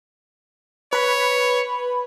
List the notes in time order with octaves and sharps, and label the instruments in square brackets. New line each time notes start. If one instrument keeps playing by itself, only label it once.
[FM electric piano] B4 B5 [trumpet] C#5